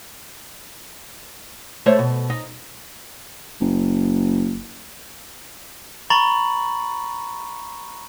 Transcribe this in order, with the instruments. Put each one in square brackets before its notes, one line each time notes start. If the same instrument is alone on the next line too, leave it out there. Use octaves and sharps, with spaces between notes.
[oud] A3 C5 C#5
B2
D#4
[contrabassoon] F#1
[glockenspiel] A#5 B5 C#6 A6 F#7